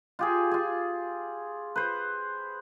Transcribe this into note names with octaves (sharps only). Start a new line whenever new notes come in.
F4 G4 G#4
F4 G#4
B4 C5